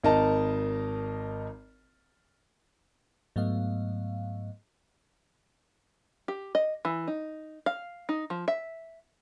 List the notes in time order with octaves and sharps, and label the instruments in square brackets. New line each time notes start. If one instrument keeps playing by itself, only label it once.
[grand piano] G#1 D#4 A#4 D#5 A5
[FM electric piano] G#2 F#3 A3 B3 D#5 F5
[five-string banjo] G4
D#5
E3
D#4
F5
D#4
F3
E5